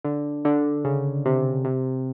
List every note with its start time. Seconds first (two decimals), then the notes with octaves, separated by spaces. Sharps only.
0.04 D3
0.45 D3
0.85 C#3
1.26 C3
1.65 C3